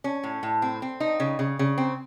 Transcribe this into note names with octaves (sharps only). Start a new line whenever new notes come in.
C#4
A2
A2
C4
C4
D#4
C#3
C#3
C#3
C4